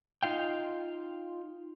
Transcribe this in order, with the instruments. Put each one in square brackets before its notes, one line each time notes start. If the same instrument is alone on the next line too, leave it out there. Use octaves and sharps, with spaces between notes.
[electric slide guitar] D#4 F4 F5 G5